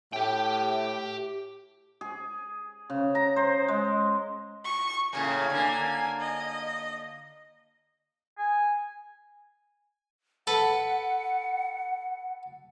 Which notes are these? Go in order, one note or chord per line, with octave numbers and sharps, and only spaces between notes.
A2 G4 G5
G#4
C#3
A#5
C5
G#3
C#6
A2 C#3 A#3 G#5
D3 A#3
D#5
G#5
A4 B4 F#5